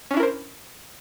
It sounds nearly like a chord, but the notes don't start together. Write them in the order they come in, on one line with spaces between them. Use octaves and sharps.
C#4 D4 E4 A#4 C5